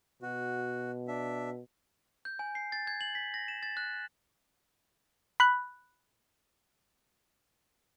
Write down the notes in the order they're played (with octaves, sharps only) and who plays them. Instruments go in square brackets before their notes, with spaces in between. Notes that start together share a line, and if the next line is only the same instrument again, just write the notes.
[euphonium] B2 [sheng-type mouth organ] F#4
[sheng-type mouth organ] D4 E5
[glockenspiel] G6
G#5
C7
A6
G#6
F#7
B6
A#6
E7
A6
F#6
[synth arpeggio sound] B5 F#6